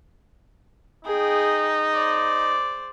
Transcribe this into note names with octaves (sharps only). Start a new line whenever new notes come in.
D#4 G#4 G5
C5 D5